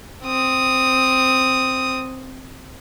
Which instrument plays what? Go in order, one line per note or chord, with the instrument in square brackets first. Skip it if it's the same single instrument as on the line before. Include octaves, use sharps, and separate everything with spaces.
[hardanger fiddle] C4 D#6